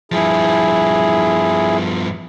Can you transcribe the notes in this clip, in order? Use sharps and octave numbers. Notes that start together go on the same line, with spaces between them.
G2 F3 E4 G#4